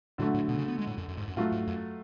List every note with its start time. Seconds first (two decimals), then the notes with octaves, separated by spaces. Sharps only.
0.18 A2 D3 F#3 A3
0.34 A2
0.48 B2
0.58 C#3
0.68 B3
0.78 G#3
0.87 A2
0.98 F#2
1.08 F#2
1.17 G#2
1.28 F#2
1.37 A2 F#3 A3 F4
1.52 G#2
1.67 F#2